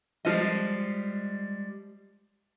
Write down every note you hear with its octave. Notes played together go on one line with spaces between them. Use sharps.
F3 G3 G#3 D#5